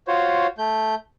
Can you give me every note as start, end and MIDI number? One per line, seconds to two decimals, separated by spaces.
0.08 0.47 65
0.08 0.47 66
0.08 0.47 72
0.08 0.47 73
0.58 0.95 57
0.58 0.95 91